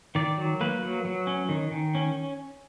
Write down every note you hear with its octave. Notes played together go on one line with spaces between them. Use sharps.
D#3 D5
F#3
A#3 B4
F#3
F#3
C#4
D#3
D#3
C#4